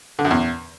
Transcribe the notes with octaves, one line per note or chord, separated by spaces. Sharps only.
D3
F#2
E2